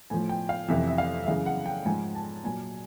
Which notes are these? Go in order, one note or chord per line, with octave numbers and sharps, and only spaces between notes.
A2 F3 G#5
G5
F5
F2 C3 E3 E5
E5
F5
E5
F#2 C#3 E3 F5
F#5
G5
G#2 F3 G#5
A5
A#2 F#3 G#5